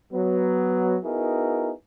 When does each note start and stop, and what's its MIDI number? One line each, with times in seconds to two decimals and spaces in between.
0.13 0.97 54
0.13 0.97 59
1.04 1.70 59
1.04 1.70 63
1.04 1.70 64
1.04 1.70 66
1.04 1.70 68
1.04 1.70 70